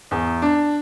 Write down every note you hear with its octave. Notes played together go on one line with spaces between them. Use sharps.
E2
D4